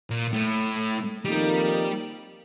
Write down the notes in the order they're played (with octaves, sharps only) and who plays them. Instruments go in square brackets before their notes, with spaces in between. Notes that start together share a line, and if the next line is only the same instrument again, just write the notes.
[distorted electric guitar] A#2
A2
[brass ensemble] F2 D#3 A#3 D#4 A#4 [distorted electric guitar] G3